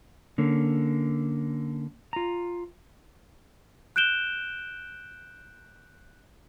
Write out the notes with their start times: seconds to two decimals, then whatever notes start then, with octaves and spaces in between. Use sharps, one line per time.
0.38 D3 A#3 C#4
2.13 F4 A#5
3.96 F#6 G6 D7 E7 G7